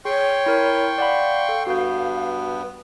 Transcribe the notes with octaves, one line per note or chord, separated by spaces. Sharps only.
G#4 C#5 G5 C6 C#6
E4 A#4 B5
D5 F5 F#5 B5
A4
G2 B3 F#4 G6